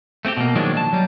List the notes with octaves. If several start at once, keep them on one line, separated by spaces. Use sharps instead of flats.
A3 C4 F#4 G4
B2 A#3
D#3 F3 F#3 G#3 A#3 D4
A5
F#3 G3